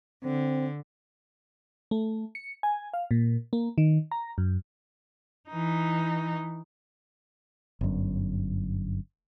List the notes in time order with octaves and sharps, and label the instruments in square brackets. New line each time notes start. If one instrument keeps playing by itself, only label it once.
[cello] D3 [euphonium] C4
[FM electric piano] A3
C#7
G#5
F5
A#2
A#3
D#3
A#5
F#2
[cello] E3 D#4
[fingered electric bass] G1 F#2